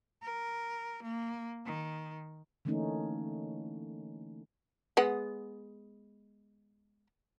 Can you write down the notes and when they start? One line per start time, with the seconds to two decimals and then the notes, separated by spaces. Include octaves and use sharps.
0.22 A#4
1.02 A#3
1.65 D#3
2.65 D3 E3 A3 A#3 C#4 D#4
4.97 G#3 B3 F#5